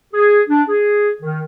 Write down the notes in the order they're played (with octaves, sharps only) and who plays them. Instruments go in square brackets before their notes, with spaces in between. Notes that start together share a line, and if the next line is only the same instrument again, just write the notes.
[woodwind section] G#4
D4
G#4
D#3